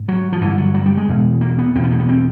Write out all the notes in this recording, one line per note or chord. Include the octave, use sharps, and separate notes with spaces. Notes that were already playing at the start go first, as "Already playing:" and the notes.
Already playing: G#2
F#3
F3
G2 D3 E3
F#3
F#3
G3
G#3
E2 B2
A#3
B3
E2 B2 B3 C4
A#3
B3
C4